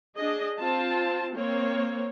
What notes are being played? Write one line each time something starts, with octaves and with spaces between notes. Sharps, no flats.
D4 G#4 D#5
C4 F4 A5
A#3 C4 C#5